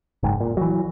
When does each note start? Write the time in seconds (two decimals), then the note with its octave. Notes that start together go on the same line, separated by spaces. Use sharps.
0.23 F#1 G#2
0.41 A#2
0.57 E3 F#3